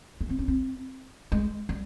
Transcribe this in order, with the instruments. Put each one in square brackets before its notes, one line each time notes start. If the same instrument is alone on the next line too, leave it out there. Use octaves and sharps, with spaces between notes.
[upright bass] A#3
C4
C#4
C4
G#3
G3